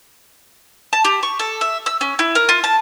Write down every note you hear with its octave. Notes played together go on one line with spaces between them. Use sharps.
A5
G4
C#6
A4
E5
E6
C#4
E4
A#4
F4
A5